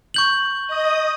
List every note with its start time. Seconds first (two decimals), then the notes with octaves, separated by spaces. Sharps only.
0.14 C#6 G6 F#7
0.67 D#5 D#6